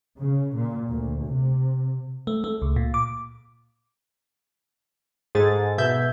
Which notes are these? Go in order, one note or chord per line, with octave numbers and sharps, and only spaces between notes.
C#3
A#2
D2
C3
A3
A3
C#2
A#2
D6
G#2 G#4 A4 A6
B2 E5 G6 G#6